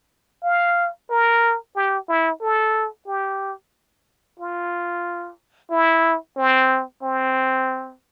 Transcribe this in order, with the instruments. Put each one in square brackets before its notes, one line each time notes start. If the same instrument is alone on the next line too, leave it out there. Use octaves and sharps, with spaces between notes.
[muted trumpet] F5
A#4
G4
E4
A4
G4
F4
E4
C4
C4